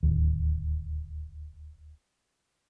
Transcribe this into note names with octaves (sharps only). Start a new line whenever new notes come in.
D1 D#2